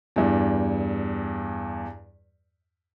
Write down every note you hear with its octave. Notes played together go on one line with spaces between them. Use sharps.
E2 G2